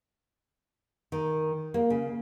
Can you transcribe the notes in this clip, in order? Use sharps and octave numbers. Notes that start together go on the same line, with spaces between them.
D#3
A#3
C#3